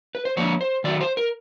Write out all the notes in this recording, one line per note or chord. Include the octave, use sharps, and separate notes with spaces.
B4
C5
F3 A#3 D4 C#5
C5
D#3 F#3 A3 D5
C5
A#4